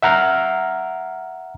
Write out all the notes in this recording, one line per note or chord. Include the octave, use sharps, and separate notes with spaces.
E5 F#5 A#5 F6